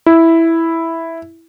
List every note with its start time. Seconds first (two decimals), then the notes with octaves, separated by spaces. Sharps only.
0.06 E4